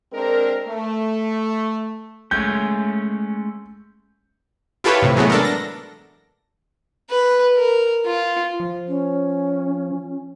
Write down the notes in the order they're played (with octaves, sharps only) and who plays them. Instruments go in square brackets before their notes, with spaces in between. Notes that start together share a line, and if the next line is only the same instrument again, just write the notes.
[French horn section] G#3 C4 D4 A#4
A3
[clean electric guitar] G#3 A3 C#4 [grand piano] G6
[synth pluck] E4 F4 G4 A4 B4 C#5
A2 C3
E3 F#3 G#3 A3 B3
D4 A4 A#4
A#6
[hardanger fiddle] B4
A#4
F4
[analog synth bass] F3
[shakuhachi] C#4